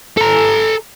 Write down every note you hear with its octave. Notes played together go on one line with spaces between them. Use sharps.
A4 A#5